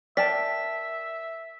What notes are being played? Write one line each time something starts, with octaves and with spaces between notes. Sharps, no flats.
A#4 D5 E5 G5 A5 B6